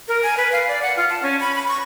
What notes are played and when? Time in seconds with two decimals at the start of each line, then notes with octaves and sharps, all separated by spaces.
0.08 A#4
0.23 G#5
0.37 B4
0.52 F5
0.68 D5
0.82 F#5
0.97 F4
1.10 A5
1.23 C#4
1.40 B5
1.56 B5
1.68 C#6